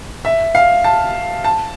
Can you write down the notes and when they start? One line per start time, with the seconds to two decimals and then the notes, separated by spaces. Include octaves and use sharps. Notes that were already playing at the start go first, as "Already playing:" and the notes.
0.25 E5
0.55 F5
0.84 A5
1.44 A5